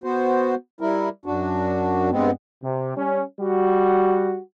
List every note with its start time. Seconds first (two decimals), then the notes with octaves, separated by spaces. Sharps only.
0.04 B3 F#4 C5
0.81 G3 E4 A#4
1.26 F#2 D4 F#4
2.12 G2 G#3 B3 C4
2.63 C3
2.96 G3 C#4
3.40 G3 F#4